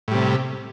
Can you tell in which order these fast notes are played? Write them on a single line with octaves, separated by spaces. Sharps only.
A2 G3 C3